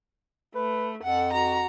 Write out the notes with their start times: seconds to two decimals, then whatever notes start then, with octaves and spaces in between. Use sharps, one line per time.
0.55 A3 B4
1.03 F2 A4 F#5
1.33 F#4 A#5